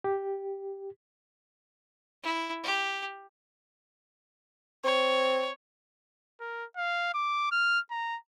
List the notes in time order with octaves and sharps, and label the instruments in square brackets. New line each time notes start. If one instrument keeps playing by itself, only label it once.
[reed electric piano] G4
[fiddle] E4
G4
[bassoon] C4 [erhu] C#5
[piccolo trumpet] A#4
F5
D6
F6
A#5